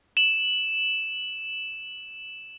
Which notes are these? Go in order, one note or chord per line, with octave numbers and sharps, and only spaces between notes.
E7 F#7